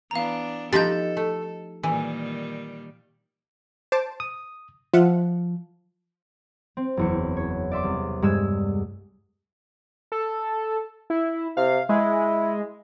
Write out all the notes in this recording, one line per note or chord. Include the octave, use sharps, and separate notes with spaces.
E3 B3 D4 F5 A#5
F3 D#4 F4 G4 A4 B4 G6 A6
A3
A#2 D#3 E3 G3
C5 A5 D6
D#6
F3 F4 E5 F#5
C4
F#1 E2 C#7
C#5
D5 E5 C6 D6
C2
G2 G#3 E6 G#6
A4
E4
C3 F5
G#3 E4